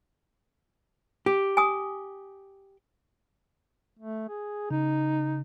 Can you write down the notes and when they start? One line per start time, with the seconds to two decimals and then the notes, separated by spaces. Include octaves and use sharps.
1.26 G4
1.57 G#5 D#6
3.99 A3
4.28 G#4
4.71 C#3 D#4